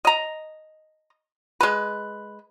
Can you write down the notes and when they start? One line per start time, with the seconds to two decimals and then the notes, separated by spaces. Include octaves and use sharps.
0.05 D#5 A#5
1.61 G#3 B4